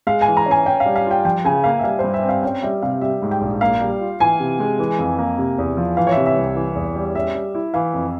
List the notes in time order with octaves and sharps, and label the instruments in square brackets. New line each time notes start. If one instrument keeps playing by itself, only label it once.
[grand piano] G#3 [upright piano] F5
[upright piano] G#5
[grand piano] E3
[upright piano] A#5
[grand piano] C#4
[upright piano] G#5
[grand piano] C#4 [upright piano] G5
[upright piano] F5
[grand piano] G3
[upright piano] F5
[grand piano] F4
[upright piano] G5
[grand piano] F3 [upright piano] G5
[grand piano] C#3 [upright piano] G#5
[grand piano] A#3 [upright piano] F5
[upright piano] E5
[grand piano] G3 [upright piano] F5
[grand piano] G2 [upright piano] C5
[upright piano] E5
[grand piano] C4
[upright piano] F5
[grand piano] C#4 [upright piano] G5
[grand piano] G3 [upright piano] E5
[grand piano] C3 [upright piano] F5
[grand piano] G3 [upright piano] E5
[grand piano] G#2
[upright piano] G5
[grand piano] A#1
[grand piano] A#3 [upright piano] F5
[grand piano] G3
F4
[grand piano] E3 [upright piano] G#5
[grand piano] C3
G#3
E3
F2
A#3
C3
E2
F3
[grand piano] E3 [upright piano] F5
[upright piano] C#5
[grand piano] C3 [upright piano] E5
[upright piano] E5
[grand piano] C2
E3
E2
G3
[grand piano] C#4 [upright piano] E5
[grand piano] G3
E4
[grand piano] E3 [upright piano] F5
[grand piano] F2